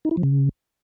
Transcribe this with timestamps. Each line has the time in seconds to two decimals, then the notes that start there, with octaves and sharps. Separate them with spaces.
0.05 D#4
0.11 E4
0.17 F3
0.23 C#3